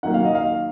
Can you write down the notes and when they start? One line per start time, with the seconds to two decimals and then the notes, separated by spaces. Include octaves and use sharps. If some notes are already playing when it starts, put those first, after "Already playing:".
0.03 D#3 F#3 A#3 F#5
0.14 F5
0.25 D#5
0.35 F5